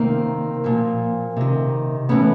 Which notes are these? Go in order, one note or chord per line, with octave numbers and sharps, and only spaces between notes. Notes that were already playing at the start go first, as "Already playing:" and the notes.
Already playing: C3 D#3 A#3 C4
A#2 F3
C3 D#3
A2 E3 B3 C#4